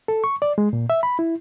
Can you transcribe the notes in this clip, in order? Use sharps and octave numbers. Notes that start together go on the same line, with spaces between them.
A4
C#6
D5
G#3
A#2
E5
B5
E4